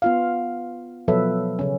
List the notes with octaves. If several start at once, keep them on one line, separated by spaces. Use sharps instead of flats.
B3 F4 F5
B2 F3 F#3 A4 B4 E5
C#3 C#4